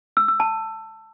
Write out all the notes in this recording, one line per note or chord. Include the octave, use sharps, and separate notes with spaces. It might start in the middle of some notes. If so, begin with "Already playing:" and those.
E6
E6
A5